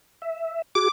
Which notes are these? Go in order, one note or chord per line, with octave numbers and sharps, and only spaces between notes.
E5
F#4 G#4 D6